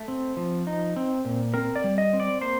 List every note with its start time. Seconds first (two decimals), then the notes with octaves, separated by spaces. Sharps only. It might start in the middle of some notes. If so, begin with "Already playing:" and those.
Already playing: A3
0.08 C4
0.37 F3
0.67 D#4
0.96 C4
1.25 A#2
1.54 C4 A#4
1.76 D5
1.84 G3
1.98 D#5
2.13 C4
2.20 D5
2.41 A#3 C5